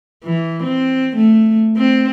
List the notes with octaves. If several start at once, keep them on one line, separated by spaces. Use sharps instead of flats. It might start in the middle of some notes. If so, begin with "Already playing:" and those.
E3
C4
A3
C4